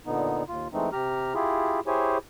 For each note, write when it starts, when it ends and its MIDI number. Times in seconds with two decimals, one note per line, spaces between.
0.06 0.43 46
0.06 0.43 50
0.06 0.43 59
0.06 0.43 63
0.48 0.68 39
0.48 0.68 65
0.73 0.89 52
0.73 0.89 56
0.73 0.89 57
0.73 0.89 60
0.73 0.89 63
0.93 1.34 48
0.93 1.34 67
0.93 1.34 82
0.93 1.34 89
1.35 1.80 64
1.35 1.80 65
1.35 1.80 67
1.35 1.80 68
1.87 2.18 64
1.87 2.18 67
1.87 2.18 68
1.87 2.18 72
1.87 2.18 73
1.87 2.18 80